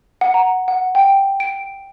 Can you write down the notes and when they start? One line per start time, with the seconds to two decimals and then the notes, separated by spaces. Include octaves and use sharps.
0.21 F#5
0.34 A#5
0.68 F#5
0.95 G5
1.40 D7